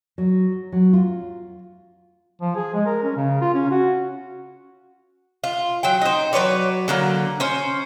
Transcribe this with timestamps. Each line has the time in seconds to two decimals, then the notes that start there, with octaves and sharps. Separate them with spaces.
0.18 F#3
0.72 F#3
0.93 F4
2.41 F3
2.56 G#4
2.74 G#3
2.86 A#4
3.03 C#4
3.17 C#3
3.42 F4
3.54 C#4
3.71 F#4
5.44 F4
5.83 F#3 G5
6.01 D#4 C5
6.33 F#3 B4 C#5 D5
6.88 D3 F#3 A#3
7.40 C#4 C5